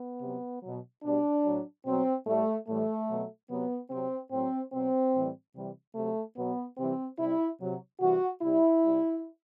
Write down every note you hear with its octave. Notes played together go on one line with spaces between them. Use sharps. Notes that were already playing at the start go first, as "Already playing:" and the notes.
Already playing: B3
C3 F#3
B2 F#3
B2 G3 D4
A2 F#3
B2 F#3 C4
A2 G3 A3
A2 E3 G3 A3
B2 F#3
C3 F#3 B3
C3 F#3 C4
A2 F#3 C4
B2 F#3 C4
A2 E3 G3
C3 E3 G3
C3 F#3 A3
B2 F#3 B3
C3 E3 G3 C4
C3 G3 E4
C3 F#3
C3 E3 G3 F#4
C3 G3 E4
C3 G3